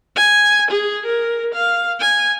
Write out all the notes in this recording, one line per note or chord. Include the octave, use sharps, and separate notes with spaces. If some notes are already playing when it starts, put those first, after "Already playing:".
G#5
G#4
A#4
F5
G#5